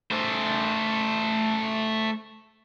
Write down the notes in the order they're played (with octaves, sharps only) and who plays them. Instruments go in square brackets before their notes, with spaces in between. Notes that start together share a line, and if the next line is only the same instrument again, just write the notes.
[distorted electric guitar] A3 C5